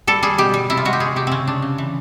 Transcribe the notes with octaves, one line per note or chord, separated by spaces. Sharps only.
G3 A4
G3 G#4
B2 G4
G3
C3 E4
F4
G#3 F#4
G4
G#3 G#4
C3 G4
C#3 C4 C#4
C#3 D4
C#3
E3